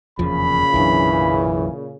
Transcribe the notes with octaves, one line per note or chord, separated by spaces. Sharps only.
F1 E2 A#2 C#3 F3 B5
B1 F#2 E3 D4